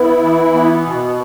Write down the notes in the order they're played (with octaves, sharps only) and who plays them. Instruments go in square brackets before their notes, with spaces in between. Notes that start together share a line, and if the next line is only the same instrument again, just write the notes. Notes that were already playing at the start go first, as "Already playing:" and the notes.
Already playing: [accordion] B3 E4 [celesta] B4
[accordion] E3
B3
B2